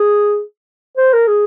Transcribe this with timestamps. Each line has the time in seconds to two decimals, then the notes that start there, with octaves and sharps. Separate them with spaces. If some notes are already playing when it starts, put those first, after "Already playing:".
Already playing: G#4
0.97 C5
1.13 A#4
1.28 G#4